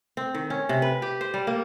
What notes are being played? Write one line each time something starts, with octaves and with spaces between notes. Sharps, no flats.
C4
D#3
C#4
C3
B4
G4
C5
G3
A#3